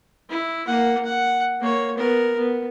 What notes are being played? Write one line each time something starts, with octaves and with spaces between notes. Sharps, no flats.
E4
A#3 F#5
F#5
A#3 C#5
B3 A#4
B3